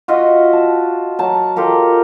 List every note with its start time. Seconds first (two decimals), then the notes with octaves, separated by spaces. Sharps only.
0.08 F4 F#4 D#5 E5
0.53 A5
1.19 F#3 A5
1.56 F4 G4 A4 A#4